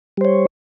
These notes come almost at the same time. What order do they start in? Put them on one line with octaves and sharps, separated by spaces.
G3 C5 C#5